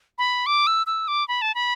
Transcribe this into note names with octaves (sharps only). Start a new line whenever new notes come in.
B5
D6
E6
E6
D6
B5
A5
B5